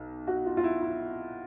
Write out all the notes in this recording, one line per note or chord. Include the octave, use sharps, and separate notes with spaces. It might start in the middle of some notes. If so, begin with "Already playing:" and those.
Already playing: B1
F#4
F4
F4
E4
E4